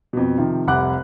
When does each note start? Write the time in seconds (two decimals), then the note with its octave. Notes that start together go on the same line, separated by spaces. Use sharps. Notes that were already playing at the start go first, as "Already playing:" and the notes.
0.13 F2 B2
0.38 C3 D#3 F3
0.67 F1 C2 F#5 D6 F#6